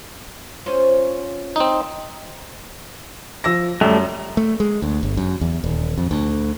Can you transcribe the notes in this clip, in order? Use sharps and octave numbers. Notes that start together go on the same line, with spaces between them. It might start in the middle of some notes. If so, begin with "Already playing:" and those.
C#4 F4 C5
C4 D#4
F3 E6 A#6
F#2 G3 A3
A3
G#3
D2
G1
F#2
E2
D#1
F2
D2